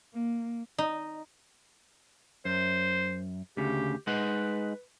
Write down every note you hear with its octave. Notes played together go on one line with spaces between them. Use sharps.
A#3
D#4
F#2 C5
D2 C#3 G4
G#3 D#4 B4 F#5